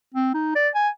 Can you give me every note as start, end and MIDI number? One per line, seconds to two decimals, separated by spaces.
0.14 0.30 60
0.34 0.55 63
0.55 0.69 74
0.75 0.89 80